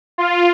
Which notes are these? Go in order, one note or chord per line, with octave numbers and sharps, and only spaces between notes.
F4